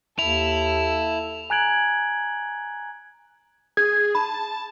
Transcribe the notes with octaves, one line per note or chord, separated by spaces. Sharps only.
D#2 E4 A4 F7
G#5 A#5 F#6 G#6 D7 F#7
G#4 G#6
A5 B5